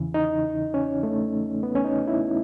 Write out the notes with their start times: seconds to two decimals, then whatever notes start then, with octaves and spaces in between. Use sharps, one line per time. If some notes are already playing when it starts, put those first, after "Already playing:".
Already playing: E2 C#3 E3
0.14 D#4
0.74 C#4
1.03 A3
1.63 B3
1.75 C#4
1.85 D#4
2.07 E4